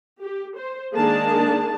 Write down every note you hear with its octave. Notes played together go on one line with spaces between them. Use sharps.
G4
C5
D#3 G#3 A#3 D4 G#4 A5